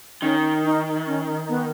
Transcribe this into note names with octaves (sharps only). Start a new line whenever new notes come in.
D#3 C#4
D#4
C#4
B3